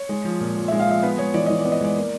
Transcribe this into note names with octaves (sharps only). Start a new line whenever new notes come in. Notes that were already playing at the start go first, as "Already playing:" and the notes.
Already playing: C#5
G#3
F3
A#2
A#2
G#3 E5
F5
F3 E5
B3 B4
G#3 C#5
E3 D5
E3 D#5
D5
B3
D#5
G#3 D5
A#3